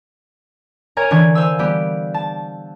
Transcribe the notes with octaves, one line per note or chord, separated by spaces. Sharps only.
A#4 C#5 G#5 A#5 G#6
D3 E3 D4 C#6 G#6
C5 F5 G#5 E6
G3 B3 G4
A5